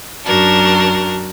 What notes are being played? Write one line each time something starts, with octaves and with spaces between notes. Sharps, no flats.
F#2 D4 F#4 A#4 A5